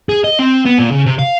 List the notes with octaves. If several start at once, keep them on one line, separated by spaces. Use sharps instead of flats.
G#4
D#5
C4
B3
A#2
C#3
C3
F5